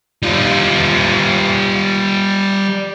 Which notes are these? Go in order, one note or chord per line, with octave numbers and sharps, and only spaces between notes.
G3 F4